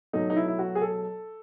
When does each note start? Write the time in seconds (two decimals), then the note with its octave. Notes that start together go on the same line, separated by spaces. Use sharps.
0.13 B2 F#3 A3 D#4
0.30 D#4
0.36 E4
0.48 E4
0.59 F#4
0.75 G#4
0.81 A4